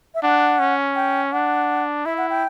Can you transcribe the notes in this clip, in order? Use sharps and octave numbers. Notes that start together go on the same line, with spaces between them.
E5
D4 F#5
C#4
G5
D4 F#5
E4 E5
F#5
G5